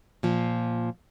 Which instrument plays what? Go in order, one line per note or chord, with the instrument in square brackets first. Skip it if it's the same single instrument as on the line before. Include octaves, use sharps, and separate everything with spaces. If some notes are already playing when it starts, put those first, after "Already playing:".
[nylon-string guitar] A#2 F3